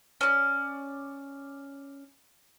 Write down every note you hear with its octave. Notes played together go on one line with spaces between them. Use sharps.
C#4 D5